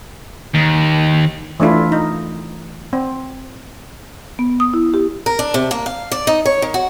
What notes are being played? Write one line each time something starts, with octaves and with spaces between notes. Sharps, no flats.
D#2
E3 A3 D4 E4 F4
D#4
C4
B3
D#6
E4
G4
A#4
D4
C3
A#3
F5
D5
D#4
C#5
D#3
F#4